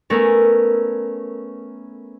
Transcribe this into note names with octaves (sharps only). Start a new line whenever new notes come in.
A3 B3 C#4 A#4